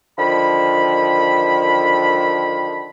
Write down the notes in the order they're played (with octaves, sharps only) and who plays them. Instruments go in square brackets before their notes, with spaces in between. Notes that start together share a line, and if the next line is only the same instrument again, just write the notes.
[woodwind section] D3 D#3 F3 B5